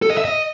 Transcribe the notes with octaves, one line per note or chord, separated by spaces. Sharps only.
A4
D#5
E5
D#5